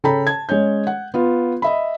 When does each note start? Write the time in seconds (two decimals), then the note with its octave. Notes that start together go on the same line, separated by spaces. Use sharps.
0.04 C#3 A4 G5 A#5 B5
0.27 A5 G#6
0.49 G#3 C#4 C#5 G6
0.87 F#5
1.14 B3 F4
1.62 D#5 E5 B5